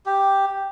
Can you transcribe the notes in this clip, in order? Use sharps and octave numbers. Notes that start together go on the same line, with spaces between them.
G4